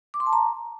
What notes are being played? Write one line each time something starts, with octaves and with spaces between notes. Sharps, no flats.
D6
C6
A5
A#5